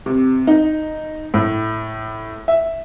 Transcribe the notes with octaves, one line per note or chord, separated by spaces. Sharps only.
C3
D#4
A2
E5